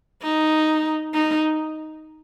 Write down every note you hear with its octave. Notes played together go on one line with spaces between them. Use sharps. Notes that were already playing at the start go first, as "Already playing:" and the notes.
D#4
D#4